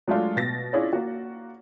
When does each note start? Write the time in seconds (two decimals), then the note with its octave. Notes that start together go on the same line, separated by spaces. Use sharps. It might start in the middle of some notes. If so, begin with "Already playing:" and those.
0.08 F#3 G#3 A3 D4 F4
0.36 B2 A6 A#6
0.73 C#4 D4 E4 F4 G#4 C#5
0.93 A#3 F#4